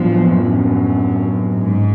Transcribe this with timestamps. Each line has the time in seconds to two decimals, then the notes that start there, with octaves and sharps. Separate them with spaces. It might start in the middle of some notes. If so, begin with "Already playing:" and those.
Already playing: A2 F3 F#3 B3 D4
0.36 F#2
1.53 G#2